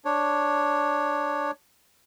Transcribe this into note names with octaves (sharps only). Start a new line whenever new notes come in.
D4 C#5